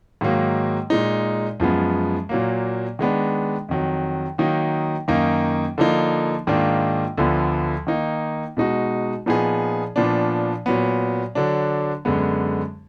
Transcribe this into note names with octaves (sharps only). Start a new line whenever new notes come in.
G#2 D#3 F#3 A#3
A#2 G#3 D#4
F#2 F3 G#3 B3
A#2 F#3 A#3
D#3 G#3 B3 D4
F2 D#3 F#3
D#3 F#3 A#3 D#4
F#2 D#3 A#3 D#4
D3 F3 A#3 D#4
G#2 D#3 A#3 D4 F4
D2 D3 F3 B3
D#3 A#3 D#4
B2 G#3 D#4 F#4
A#2 F3 B3 D#4 G#4
A#2 F3 B3 D4
A#2 F#3 B3
D3 F#3 D4
F#2 D3 G#3 B3